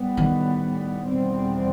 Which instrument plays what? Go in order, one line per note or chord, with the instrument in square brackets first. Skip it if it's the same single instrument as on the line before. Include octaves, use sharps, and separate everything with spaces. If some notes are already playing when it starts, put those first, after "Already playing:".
Already playing: [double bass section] A2 G3 B3
[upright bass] D#3
[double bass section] E2 B2 G3 C4